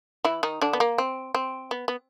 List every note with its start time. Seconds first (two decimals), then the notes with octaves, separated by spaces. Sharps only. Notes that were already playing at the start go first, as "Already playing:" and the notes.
0.25 E3 E4
0.43 D#3 D#4
0.62 D3 D4
0.73 B3
0.80 A#3
0.98 C4
1.35 C4
1.71 B3
1.88 B3